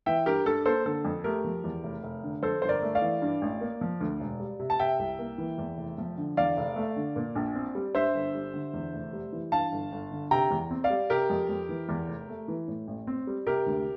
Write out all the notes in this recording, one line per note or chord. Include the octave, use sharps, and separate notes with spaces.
E3 E5 G5
G2 G4 A#4
G2 A4
A#3 A4 C5
D3 A4
F2
A3 G4 A#4
F3
E2
F1
F1
D3
F2 A4 C5
G1 C5
A#4 D5
A3
D5 F5
E3
G2
A1
A#3
F3
D2
E1
G3
C3
A5
C3 E5 G5
C2
A#3
E3
E2
F1
F3
D3
E2 D5 F5
F1
A3
D3
A#2
A#1
C4
G3
G2 C5 E5
G1
G3
D3
E2
F1
G3
E3
G2 F5 A5
G1
G1
D3
C3 G5 A#5
E2
C4
D5 F5
G3
C3 G4 A#4
F2
F2
E3
E2
F1
A3
E3
A2
A1
C4
G3
C3 G4 A#4
D2